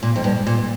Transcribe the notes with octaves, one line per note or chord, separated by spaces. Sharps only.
A#2
F2
G2
A#2